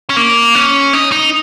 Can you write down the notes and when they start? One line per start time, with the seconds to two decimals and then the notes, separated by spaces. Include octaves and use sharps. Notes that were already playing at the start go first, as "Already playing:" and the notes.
0.10 C#4
0.17 A#3
0.55 C#4
0.93 D#4
1.12 D#4